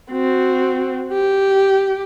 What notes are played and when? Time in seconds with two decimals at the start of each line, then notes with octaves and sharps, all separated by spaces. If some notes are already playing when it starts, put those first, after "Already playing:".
0.12 C4 F#4
1.12 G4